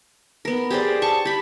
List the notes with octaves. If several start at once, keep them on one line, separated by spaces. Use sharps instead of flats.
B3 A#4
G4 G#4 C5 D5
A5 C#6
G4 B5